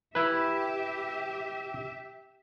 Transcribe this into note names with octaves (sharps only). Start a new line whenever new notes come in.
E4 G4 B4 E5